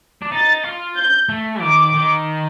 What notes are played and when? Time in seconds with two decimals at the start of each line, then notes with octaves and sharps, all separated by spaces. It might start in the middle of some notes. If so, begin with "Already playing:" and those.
0.22 D4
0.32 D#4 A6
0.64 F4
0.96 G6
1.29 A3
1.61 D#3 D6
1.93 D#3